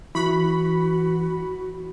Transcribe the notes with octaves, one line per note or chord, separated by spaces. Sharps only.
E3 E4 F#4 B5 C#6 F#6